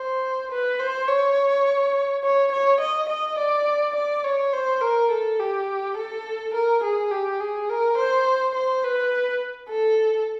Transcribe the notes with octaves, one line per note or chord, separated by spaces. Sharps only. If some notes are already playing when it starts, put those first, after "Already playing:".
Already playing: C5
B4
C5
C#5
C#5
C#5
D#5
D#5
D5
D5
C#5
C5
A#4
A4
G4
A4
A#4
G#4
G4
G#4
A#4
C5
C5
B4
A4